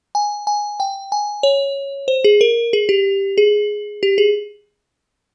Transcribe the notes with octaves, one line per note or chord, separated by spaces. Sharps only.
G#5
G#5
G5
G#5
C#5
C5
G#4
A#4
G#4
G4
G#4
G4
G#4